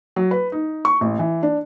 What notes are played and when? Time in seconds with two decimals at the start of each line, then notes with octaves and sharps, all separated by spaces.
0.16 F#3
0.31 B4
0.52 D#4
0.85 C#6
1.01 A1
1.19 E3
1.43 D4